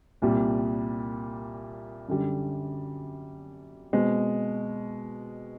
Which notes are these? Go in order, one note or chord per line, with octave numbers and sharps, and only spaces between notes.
C2 A#2 G3
F#2 D3 G3
B2 G#3 C4